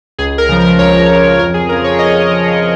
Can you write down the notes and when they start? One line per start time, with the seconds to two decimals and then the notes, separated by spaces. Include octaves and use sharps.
0.19 C#2 G#4
0.38 A#4
0.49 C#3 F3
0.59 A#4
0.79 C#2 C#5
1.09 C#3 F3
1.39 F2 A#4
1.54 G#4
1.69 C#3 A#4
1.72 F3
1.84 C#5
1.99 F2 D#5
2.29 C#3 F3